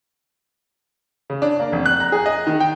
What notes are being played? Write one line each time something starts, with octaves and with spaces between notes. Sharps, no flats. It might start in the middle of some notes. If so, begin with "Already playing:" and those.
C#3
D4
A#3
F1
F#6
A#5
G#4
D#5
D#3
G5